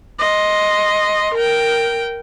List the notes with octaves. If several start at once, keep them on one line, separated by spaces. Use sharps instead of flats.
D#5 C6
A#4 G5